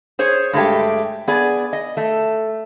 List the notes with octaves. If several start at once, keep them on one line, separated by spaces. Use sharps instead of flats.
G#4 C5 C#5
G2 G#3 A3 G4
B3 G#4 D5 G#5
D#5
A3